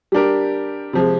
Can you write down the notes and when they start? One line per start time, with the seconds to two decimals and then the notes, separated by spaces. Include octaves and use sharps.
0.12 G3 D4 G4 A#4
0.93 C3 F3 G#3